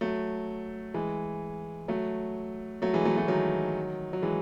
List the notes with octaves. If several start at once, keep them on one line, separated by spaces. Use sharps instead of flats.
F#3 A3
E3 G#3
F#3 A3
F#3 A3
E3 G#3
F#3 A3
F#3 A3
D#3 F#3
F#3
E3 G#3